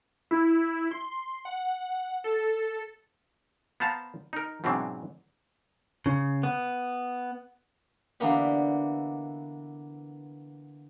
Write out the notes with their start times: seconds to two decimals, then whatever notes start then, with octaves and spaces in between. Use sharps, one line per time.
0.31 E4
0.91 C6
1.45 F#5
2.24 A4
3.80 B3 C5 F5 A5 A#5
4.33 D#4 A#4
4.64 G#2 B2 E3 F#3 C4 D4
6.06 C#3
6.43 B3
8.20 D3 E3 A#3 B3 G4